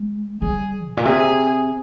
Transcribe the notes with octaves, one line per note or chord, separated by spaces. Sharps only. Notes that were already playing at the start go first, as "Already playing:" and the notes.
Already playing: G#3
G3 G#4
G#2
A#2
C3 G#4